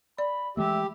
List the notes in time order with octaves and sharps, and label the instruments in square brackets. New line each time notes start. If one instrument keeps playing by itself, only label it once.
[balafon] D5 [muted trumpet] B5
[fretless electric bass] E3 G#3 A3 [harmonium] G4 [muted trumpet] E5